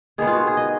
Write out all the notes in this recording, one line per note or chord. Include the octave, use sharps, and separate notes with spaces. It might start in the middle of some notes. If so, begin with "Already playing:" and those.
D#3 G#3 B3 G#4
F4
F#4
G#4
D#5